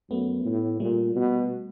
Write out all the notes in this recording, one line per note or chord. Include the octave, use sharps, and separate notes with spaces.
F#2 A3 B3
A2
A#2 G3 A3
B2